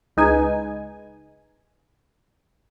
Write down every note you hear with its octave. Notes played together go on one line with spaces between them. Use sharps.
C#2 G#3 D#4 B4 G#5